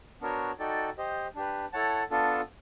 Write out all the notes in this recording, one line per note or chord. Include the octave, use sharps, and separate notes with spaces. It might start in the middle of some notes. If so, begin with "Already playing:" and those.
B3 D4 F#4 A#4 C#5
D#4 F#4 A4 D5 G5
G4 C5 D#5
D4 G4 B4
E4 A4 C#5 F#5 A5
B3 D4 F4 A4